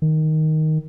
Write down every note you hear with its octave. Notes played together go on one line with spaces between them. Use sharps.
D#3